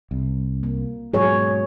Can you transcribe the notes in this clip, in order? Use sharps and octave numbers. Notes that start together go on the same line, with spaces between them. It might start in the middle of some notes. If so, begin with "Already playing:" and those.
C2
A#3
G#2 B2 F#3 G#4 C#5